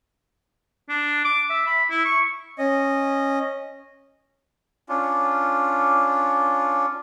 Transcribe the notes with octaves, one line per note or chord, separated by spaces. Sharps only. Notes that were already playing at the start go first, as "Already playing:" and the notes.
D4
D6
E5
B5
E4
C#6
C#4 D#5
C#4 D4 F4